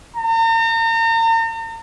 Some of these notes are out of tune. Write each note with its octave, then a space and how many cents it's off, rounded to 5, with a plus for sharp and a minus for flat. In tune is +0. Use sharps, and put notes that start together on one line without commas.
A#5 -40